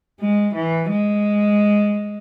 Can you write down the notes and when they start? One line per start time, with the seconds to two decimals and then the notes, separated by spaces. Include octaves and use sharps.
0.20 G#3
0.55 E3
0.90 G#3